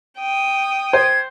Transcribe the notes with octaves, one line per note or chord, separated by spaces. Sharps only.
G5 D#6
C5 G#6